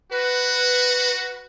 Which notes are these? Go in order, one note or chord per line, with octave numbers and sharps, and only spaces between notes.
F#4 B4